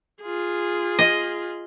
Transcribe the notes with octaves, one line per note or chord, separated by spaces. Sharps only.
F4 G#4
D#5